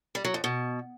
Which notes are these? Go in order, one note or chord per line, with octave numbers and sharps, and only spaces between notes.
G3
F#3
F2
B2